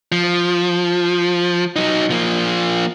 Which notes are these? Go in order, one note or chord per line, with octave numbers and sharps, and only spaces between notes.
F3
F#3 D#4
F3 A#3